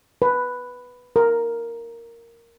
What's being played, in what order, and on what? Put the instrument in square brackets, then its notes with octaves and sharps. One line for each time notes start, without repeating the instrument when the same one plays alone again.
[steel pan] B4
A#4